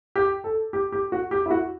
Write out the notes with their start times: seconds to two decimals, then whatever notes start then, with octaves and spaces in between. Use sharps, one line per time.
0.16 G4
0.44 A4
0.73 G4
0.92 G4
1.12 F#4
1.31 G4
1.46 E4
1.51 F#4